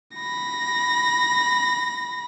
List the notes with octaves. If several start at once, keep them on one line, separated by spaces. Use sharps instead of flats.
B5 A#6